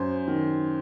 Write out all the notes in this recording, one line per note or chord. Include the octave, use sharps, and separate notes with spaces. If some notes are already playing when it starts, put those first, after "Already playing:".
Already playing: F#2 C5
D#3